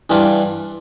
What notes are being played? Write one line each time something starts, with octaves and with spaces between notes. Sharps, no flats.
G2 E3 G3 D4 F4